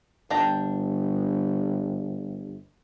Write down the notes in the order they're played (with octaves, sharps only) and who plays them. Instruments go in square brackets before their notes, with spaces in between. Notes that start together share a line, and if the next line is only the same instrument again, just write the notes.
[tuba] G1 [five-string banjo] D4 G5 A#5